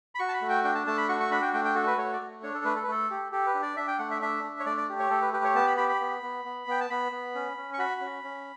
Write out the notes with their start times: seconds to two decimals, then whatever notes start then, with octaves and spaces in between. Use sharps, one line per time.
0.15 B5
0.19 F#4 C#6
0.29 A5
0.34 B5
0.41 A3
0.49 G5
0.64 D4 G5
0.75 A5
0.87 A3 A5
0.98 B5
1.09 F#4 C#6
1.20 C#6
1.31 D4 B5
1.42 G5
1.53 A3 G5
1.65 G5
1.75 F#4 A4
1.87 B4
1.98 A3 C#5
2.13 D5
2.21 A3
2.43 D4 C#5
2.54 A4
2.65 A3 B4
2.76 A4
2.83 B4
2.87 A3 A4
3.10 G4
3.32 G4 A4
3.46 B4
3.55 D4
3.63 D5
3.77 D4 E5
3.87 G5
3.99 A3 F#5
4.11 E5
4.22 D4 E5
4.43 D4
4.59 C#5
4.66 A3 D5
4.77 D5
4.89 G4
4.99 C#5
5.10 A3 A4
5.22 B4
5.33 G4 B4
5.44 C#5
5.55 B3 A5
5.67 B5
5.77 G4 B5
5.89 B5
6.01 B3
6.23 B3
6.45 B3
6.67 B3 G5
6.80 A5
6.90 B3 B5
7.12 B3
7.35 C#4
7.57 C#4
7.74 C#6
7.79 F#4 B5
8.01 C#4
8.24 C#4